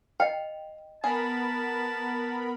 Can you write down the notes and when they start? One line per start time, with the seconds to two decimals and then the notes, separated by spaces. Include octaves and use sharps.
0.20 D#5 F5 G5
1.04 B3 G#4 A#4 A5 B5